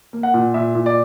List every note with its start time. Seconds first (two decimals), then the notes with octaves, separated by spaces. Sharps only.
0.13 A#3
0.23 F#5
0.34 A#2
0.54 A#2 E5
0.75 A#2
0.86 D5